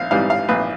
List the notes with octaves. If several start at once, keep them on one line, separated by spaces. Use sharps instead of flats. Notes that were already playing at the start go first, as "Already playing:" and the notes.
Already playing: A#1 F5
G#2 E3 G3 F5
F5
A#1 B4